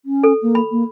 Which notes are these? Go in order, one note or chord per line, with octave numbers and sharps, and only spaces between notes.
C#4
A4
A#3
B5
A#3